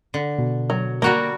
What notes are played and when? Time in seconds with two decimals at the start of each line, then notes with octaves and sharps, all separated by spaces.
0.14 D3
0.39 B2
0.70 F#3
1.02 G3 A#3 F#4 A#4